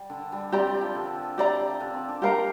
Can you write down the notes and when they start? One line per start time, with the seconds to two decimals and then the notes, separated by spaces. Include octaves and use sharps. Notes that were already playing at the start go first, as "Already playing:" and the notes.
Already playing: G3
0.10 D3
0.32 G3
0.52 C4 G4 D5 A#5
0.67 G3
0.81 F3
0.95 D3
1.38 G4 D5 A#5
1.80 D3
1.94 C4
2.09 D4
2.22 A#3 G4 A#4 F5 A#5